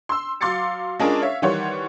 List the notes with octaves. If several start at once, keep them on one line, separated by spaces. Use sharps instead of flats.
C6 E6
F#3 F5 C6 D6 A6 C#7
G#3 C#4 D4 F4 G#4 A#4
C#5 E5 F5
D#3 E3 G3 C#5 F#5 C6